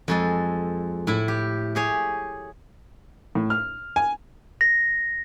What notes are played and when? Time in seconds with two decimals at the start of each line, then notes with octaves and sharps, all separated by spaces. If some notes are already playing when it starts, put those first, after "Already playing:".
0.08 F2 G#3 A4
1.07 A2 E4
1.28 G4
1.75 G4 G#4 C#5
3.35 A2
3.50 F6
3.96 G#5
4.61 A#6